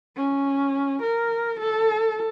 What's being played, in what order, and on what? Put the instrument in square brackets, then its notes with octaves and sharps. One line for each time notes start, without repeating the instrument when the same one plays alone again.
[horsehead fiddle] C#4
A#4
A4